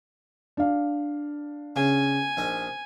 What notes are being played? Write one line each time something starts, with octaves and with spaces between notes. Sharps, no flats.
D4 F5
C#3 G#5
A#1 D#4